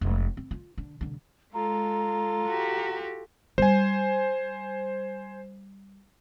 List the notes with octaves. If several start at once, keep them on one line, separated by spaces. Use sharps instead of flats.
F1 G#3
C4
F4
D3
C2 D3
G#3 F4 A4 A#5
F#4 G4
G3 C5 G#5